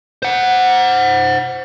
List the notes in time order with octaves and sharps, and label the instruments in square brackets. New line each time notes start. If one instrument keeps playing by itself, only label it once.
[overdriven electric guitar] C5 F#5